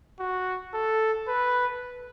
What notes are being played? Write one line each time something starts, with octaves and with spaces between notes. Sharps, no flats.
F#4
A4
B4